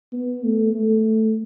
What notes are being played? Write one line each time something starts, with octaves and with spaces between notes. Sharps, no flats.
B3
A3
A3